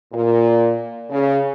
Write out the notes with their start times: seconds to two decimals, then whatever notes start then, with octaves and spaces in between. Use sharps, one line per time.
0.12 A#2
1.09 C#3